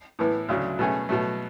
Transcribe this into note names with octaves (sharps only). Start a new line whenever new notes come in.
A2 E3 B3
D2 C#3 F#3
B2 A3 C#4 G#4
B2 F#3 A3